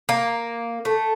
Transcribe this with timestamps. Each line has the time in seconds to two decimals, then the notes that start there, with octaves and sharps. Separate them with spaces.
0.09 A#3
0.85 A3